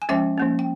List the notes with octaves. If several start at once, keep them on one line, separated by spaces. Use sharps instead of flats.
G#5
F3 G#3 C#4 E5 G5
F3 A#3 C#4
G5